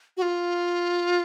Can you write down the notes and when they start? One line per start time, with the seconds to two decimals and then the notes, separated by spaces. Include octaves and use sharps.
0.17 F#4
0.22 F4